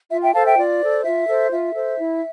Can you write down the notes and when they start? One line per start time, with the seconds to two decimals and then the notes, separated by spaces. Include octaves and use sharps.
0.11 F4 E5
0.22 E5 G5
0.33 A4 C5 F5 A5
0.46 E5 G5
0.57 F4 D5
0.81 A4 C5
1.03 F4 E5
1.27 A4 C5
1.51 F4 E5
1.74 A4 C5
1.97 E4